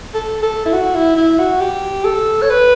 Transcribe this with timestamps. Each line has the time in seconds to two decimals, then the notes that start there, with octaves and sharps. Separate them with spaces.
0.14 A4
0.43 A4
0.65 E4
0.73 F#4
0.95 E4
1.16 E4
1.39 F#4
1.60 G4
2.05 A4
2.42 C#5
2.50 B4